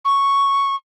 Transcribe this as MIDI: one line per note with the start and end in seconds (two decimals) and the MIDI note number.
0.05 0.75 85